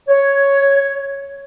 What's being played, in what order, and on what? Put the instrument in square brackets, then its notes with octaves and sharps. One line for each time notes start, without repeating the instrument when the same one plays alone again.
[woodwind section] C#5